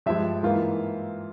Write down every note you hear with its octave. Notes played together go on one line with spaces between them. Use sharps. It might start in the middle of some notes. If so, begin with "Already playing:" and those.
G2 F3 G#3 E5
G#2 E3 A#3 F4